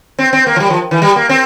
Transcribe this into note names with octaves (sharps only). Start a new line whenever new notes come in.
C4
C4
A#3
F3
G3
F3
E3
G3
A#3
C4